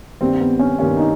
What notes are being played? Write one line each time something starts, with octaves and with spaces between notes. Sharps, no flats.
G2 D#3 G3 A#3 C4
B3
C#4
G2 D#3 G3 A#3 C#4
D#4